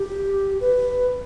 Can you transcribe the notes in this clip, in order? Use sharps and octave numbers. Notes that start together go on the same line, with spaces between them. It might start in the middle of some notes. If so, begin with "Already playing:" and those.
Already playing: G4
B4